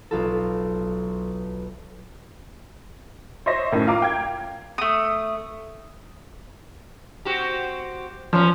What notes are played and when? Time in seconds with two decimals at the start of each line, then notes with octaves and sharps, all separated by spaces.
0.11 B1 F4 A4
3.46 C5 C#5 D#5 E5 C6 A#6
3.72 F#2 A2 D#3
3.87 F4 F5 A#5 D6
4.02 G5 G#6
4.78 A3 D#6
7.25 C4 F#4 G4
8.33 F#2 F3 C#4